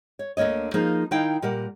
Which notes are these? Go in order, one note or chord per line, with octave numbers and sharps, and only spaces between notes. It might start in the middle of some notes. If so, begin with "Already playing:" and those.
C#5
D2 D3 A#3 C#5 D#5
F3 A#3 D#4 F4 G#4 C5
D#3 D#4 E4 F5 G5
A#2 G3 A#4 F#5